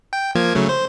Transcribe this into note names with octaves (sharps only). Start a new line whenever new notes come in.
G5
F3 A#3 G#6
C#3 F#3 A3
C5